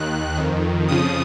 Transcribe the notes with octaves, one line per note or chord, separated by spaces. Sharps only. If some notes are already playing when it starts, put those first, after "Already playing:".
Already playing: D#2 D#3 F#6
F2 D#3
F2 C#3 F3 D#6